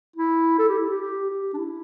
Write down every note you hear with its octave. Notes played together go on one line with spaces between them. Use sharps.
E4
A4
G4
E4
G4
G4
G4
D4
E4